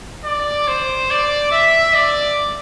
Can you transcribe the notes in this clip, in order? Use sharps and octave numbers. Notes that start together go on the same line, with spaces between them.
D5
C5
D5
E5
D5